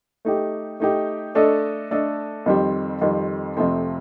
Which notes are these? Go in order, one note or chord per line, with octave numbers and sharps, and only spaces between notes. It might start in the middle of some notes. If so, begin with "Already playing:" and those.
A3 D#4 G4
A3 D#4 G4
A3 D4 A4 D#5
A3 D4 A4 D#5
F2 D#3 G3 C4 G4
F2 D#3 G3 C4 G4
F2 C3 F3 A3 C4